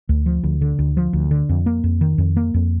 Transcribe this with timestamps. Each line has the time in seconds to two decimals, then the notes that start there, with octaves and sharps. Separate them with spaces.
0.09 D2
0.26 F3
0.43 D2
0.61 D3
0.79 D2
0.97 F3
1.13 D2
1.31 D3
1.49 F2
1.66 A#3
1.84 F2
2.01 D#3
2.18 F2
2.37 A#3
2.54 F2